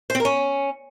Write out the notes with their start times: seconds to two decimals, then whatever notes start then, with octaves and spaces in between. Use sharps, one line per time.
0.10 C5
0.15 C4
0.20 A#4
0.25 C#4